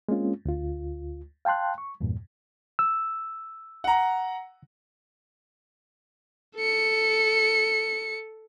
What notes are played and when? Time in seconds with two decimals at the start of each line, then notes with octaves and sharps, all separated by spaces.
0.09 G#3 A#3 C4 C#4 F4
0.45 D2 F4
1.45 F5 G5 A5 C6 F#6
1.78 C#6
2.01 E2 G2 A#2
2.79 E6
3.84 F#5 A#5
6.56 A4 C#7